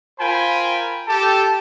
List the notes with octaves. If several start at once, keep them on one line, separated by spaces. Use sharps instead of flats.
F4 A#4 C5 G5 G#5 B5
G4 A4 A5